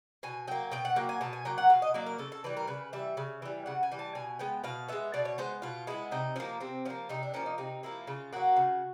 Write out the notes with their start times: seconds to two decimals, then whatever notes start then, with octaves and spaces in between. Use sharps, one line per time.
0.23 B2 G#5
0.47 F#3 A#3 G5
0.71 B2 G5
0.85 F#5
0.96 F#3 A#3 G5
1.09 G#5
1.21 B2 A5
1.33 G#5
1.45 F#3 A#3 G5
1.58 F#5
1.70 B2 F5
1.82 D#5
1.94 F#3 A#3 D5
2.06 A#4
2.18 C#3 A4
2.32 A4
2.44 E3 G3 B4
2.57 A#4
2.67 C#3 B4
2.93 E3 G3 E5
3.17 C#3
3.42 E3 G3
3.66 C#3 F#5
3.83 G#5
3.92 E3 G3
3.99 A5
4.15 B2 G#5
4.39 G#3 B3 G5
4.64 B2 F5
4.88 G#3 B3 E5
5.14 B2 D5
5.25 C#5
5.38 G#3 B3 C5
5.62 B2 F4
5.87 G#3 B3 E4
6.12 C3 D#4
6.36 F3 A#3 C#4
6.60 C3 C4
6.85 F3 C#4
6.90 A#3
7.09 C3 D#4
7.23 D4
7.34 F3 A#3 C#4
7.46 D#4
7.58 C3 D#4
7.83 F3 A#3 E4
8.07 C#3 F4
8.33 F#3 A#3 F#4
8.56 C#3